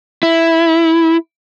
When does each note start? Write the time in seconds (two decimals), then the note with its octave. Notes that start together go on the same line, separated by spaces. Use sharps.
0.23 E4